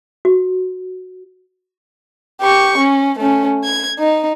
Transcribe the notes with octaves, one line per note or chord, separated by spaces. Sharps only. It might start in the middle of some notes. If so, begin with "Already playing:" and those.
F#4
G4 C#6
C#4
A3 C#4
G#6
D#4